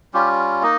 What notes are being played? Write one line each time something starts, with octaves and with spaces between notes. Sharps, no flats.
G3 C#4 F4 G4
A#3 D#4 D#5